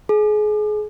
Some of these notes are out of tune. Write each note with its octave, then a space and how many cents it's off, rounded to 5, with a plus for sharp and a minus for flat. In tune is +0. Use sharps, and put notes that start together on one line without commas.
G#4 +30